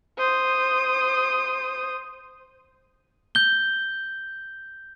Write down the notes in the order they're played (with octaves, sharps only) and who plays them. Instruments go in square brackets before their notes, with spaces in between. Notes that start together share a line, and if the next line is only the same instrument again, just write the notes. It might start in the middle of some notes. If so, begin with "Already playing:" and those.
[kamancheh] C5 D#6
[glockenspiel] G6 G7